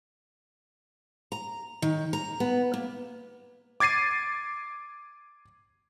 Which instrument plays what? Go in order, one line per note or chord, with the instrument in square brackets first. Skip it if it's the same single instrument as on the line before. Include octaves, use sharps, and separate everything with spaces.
[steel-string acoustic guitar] A#5
D#3
A#5
B3
A#3
[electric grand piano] D6 G#6 A6 C7 D#7